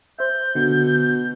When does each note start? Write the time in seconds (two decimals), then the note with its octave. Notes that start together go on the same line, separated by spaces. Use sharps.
0.19 C5 E5 G6
0.55 B2 D3 F#4